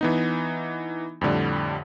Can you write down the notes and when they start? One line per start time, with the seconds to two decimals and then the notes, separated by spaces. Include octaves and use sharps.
0.01 E3 B3 D#4
1.21 F2 A2 D3 G3